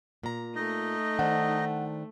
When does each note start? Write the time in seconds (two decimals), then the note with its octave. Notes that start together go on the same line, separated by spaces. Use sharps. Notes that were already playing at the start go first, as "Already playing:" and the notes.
0.23 A#2 A#5
0.56 A3 D#4 D#5
1.19 D#3 D4 C5 F#5